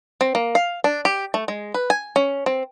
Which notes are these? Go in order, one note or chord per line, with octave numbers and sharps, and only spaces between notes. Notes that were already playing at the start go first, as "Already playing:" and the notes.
C4
A#3
F5
D4
G4
A3
G#3
B4
G#5
C#4
C4